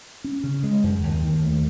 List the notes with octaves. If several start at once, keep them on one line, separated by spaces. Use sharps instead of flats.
C#4
C#3
G#3
F#2
D#2
D#3
A3